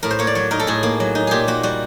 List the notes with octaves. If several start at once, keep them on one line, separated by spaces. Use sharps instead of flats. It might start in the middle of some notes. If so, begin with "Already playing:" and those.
A2 A#4
C5
A#3 C#5
D5
F#3 C#5
D#4 A#4
A4
A2 G#4
A#3
F#3
D#4
A#2 G4 G#4
A#3 F#4
G3 F#4